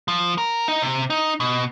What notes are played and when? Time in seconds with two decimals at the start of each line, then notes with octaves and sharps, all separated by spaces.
0.08 F3
0.38 A#4
0.68 D#4
0.82 C3
1.10 D#4
1.40 B2